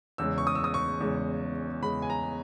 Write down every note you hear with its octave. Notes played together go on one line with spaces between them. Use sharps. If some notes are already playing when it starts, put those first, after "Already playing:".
E2 C#3 G#3 E6
C#6
D#6
E6
D#6
C#6
E2 C#3 G#3
E2 C#3 G#3 B5
G#5
A#5